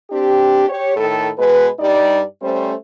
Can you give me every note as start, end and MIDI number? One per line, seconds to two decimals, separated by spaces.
0.10 0.65 60
0.10 0.65 62
0.10 0.65 67
0.68 0.93 67
0.68 0.93 73
0.97 1.29 45
0.97 1.29 51
0.97 1.29 69
1.37 1.67 47
1.37 1.67 56
1.37 1.67 71
1.79 2.22 43
1.79 2.22 55
1.79 2.22 63
1.79 2.22 74
2.41 2.73 55
2.41 2.73 57
2.41 2.73 61
2.41 2.73 72